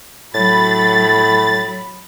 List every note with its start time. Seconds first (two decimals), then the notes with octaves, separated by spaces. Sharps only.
0.34 A2 F#3 B5 A6